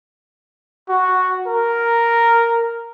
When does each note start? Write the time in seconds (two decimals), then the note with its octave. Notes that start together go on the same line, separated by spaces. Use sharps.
0.89 F#4
1.47 A#4